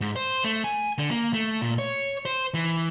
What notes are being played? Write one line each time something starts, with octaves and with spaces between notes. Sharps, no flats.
G#2
C5
A3
G#5
D3
A#3
A3
A#2
C#5
C5
E3